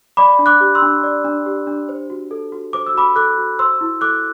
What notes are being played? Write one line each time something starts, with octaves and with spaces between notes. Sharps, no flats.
D5 B5 D6
D4
D6 F#6
G4
C6 E6
D4
D5
D4
G4
D4
C5
F#4
A4
F#4
C5 D6
E6
F#4 B5 D6
A4 D6 F#6
F#4
C5 C6 E6
E4
A4 D6 F#6